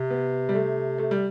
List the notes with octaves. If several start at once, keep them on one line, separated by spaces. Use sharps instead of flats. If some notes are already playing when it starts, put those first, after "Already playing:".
Already playing: C3
B3
G3
A3
A3
G3